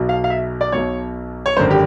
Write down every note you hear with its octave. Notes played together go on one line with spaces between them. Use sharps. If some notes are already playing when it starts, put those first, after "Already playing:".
Already playing: B1 B2 F#3
F5
F5
E5
D5
B1 B2 F#3 C#5
C#5
G#1 F#2 D3 C5
G4